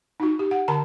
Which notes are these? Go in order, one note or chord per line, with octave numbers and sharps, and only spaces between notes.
D#4 F#4
G4
F#5
D3 A5 A#5